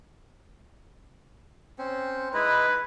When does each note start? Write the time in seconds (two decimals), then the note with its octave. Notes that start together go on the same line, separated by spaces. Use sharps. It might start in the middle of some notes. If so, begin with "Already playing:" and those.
1.78 C4 C#4 C5
2.34 G#3 D#4 E4 B4